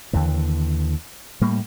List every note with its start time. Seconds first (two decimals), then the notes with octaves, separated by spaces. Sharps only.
0.13 D#2 D3 E3
1.41 A2 G3 A#3